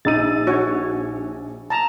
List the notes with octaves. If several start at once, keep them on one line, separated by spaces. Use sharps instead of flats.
A#1 D#4 E6 A6 D#7
F#4 C#5
A5 A#5